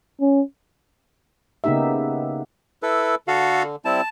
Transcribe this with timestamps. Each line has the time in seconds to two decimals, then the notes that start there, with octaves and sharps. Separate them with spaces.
0.21 C#4
1.64 C#3 A#3 B3 D#4 G4 E5
2.83 E4 A4 B4
3.28 D3 F#4 A4 F5
3.85 G3 C4 E4 A5